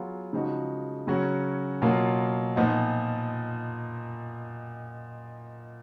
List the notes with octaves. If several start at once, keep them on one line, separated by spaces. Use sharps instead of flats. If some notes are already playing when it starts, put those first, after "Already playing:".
Already playing: F#3 B3 F4 G#4
C#3 F3 G#3 D#4 F#4
C#3 F#3 C#4 F#4 C#5
B2 F#3 A#3 F4
A#2 F3 B3 D#4